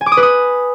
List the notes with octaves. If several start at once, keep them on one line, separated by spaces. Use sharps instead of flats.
G#5
D6
D#6
B4
D#6